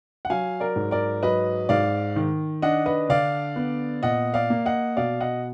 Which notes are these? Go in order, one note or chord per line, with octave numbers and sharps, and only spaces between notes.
F#5
F#3 F5 G#5
A#4 D5
G#2
A#4 D5
F#3 B4 D#5
G#2 D5 F5
D#3
D4 D#5 F#5
B4 D#5
D3 D5 F5
B3
A#2 D#5 F#5
D5 F5
A#3
D#5 F#5
B2 D5 F5
D#5 F#5